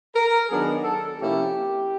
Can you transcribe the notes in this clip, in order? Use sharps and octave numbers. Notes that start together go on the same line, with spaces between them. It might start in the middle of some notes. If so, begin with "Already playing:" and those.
A#4
D#3 F#3 B3 D4 G#4
A4
C3 F3 A#3 C#4 E4 G4